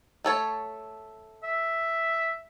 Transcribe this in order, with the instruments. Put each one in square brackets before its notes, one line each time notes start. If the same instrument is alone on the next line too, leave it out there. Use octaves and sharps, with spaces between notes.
[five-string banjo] A3 A4 C#5
[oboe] E5